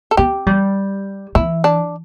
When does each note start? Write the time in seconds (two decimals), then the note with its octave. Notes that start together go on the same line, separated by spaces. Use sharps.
0.11 A4
0.17 C4 G4
0.47 G3
1.35 E3 E4
1.64 D4